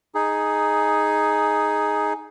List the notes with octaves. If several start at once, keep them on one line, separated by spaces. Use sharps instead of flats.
D#4 G#4